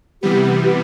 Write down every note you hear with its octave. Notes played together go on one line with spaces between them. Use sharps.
C3 E3 G3 B3 G4